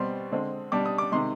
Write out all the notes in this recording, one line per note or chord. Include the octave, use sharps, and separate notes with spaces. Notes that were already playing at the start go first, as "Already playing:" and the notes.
Already playing: B2 G3 C4 C6
D3 G#3 C4
B2 G3 D4 D6
D#6
D6
C3 D#3 G#3 C6